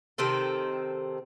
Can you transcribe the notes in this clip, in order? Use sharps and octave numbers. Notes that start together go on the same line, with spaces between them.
C3 D#3 C4 A4